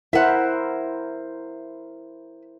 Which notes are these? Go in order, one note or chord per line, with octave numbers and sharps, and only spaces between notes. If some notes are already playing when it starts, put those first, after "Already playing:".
E4 A#4 C5 E5 F#5